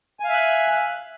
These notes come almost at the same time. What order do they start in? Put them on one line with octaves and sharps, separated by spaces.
G#5 F5 E5 F#6